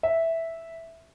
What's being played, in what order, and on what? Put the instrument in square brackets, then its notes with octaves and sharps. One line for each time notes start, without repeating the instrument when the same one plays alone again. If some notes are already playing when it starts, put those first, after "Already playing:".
[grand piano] E5